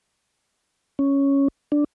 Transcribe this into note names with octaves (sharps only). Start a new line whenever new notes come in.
C#4
D4